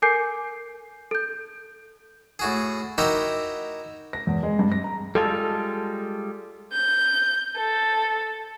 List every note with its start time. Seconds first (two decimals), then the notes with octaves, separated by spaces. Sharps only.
0.02 A4 A#4 G#5 D6 G6 C7
1.11 A4 G6
2.39 A2 F#4 G#4
2.98 D#4 E4 F#4 G4 A#4 E5
4.13 A#6
4.27 E2
4.43 G#3
4.59 G2
4.72 A#6
4.84 A#5
5.15 G3 G#3 F4 A4
6.72 G6
7.57 A4